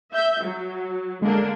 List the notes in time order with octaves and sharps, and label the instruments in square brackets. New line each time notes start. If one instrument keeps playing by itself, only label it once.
[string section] E5 G6
F#3
[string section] D3 A#3 D4 [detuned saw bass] G#3